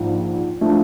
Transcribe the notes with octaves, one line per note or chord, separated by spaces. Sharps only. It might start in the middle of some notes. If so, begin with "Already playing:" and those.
Already playing: A#1 G#2 F3
F3 A3 D4